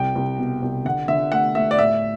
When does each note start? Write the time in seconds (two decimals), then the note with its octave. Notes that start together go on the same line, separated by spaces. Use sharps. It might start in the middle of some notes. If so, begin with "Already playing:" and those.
Already playing: C2 G5
0.15 C2
0.38 B2
0.62 C2
0.85 D3 F#5
1.08 D3 E5
1.32 A3 F#5
1.55 A3 E5
1.71 D5
1.79 A2 E5